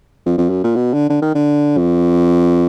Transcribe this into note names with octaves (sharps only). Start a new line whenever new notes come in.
F2
F2
F#2
A#2
B2
D3
D3
D#3
D3
F2